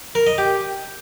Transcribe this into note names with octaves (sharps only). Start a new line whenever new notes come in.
A#4
D#5
G4